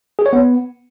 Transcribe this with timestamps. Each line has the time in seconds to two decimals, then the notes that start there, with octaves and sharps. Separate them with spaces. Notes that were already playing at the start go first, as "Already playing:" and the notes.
0.19 G#4
0.26 C#5
0.33 B3